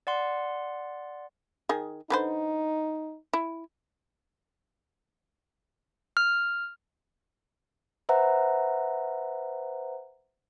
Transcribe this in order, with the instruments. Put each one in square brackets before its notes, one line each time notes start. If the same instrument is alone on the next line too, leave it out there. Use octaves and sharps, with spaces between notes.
[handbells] D5 F#5 C6
[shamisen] D#3 G#4
[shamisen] D3 B4 C5 [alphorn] D#4
[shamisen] E4
[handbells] F6
[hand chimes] B4 C5 E5 F#5 A#5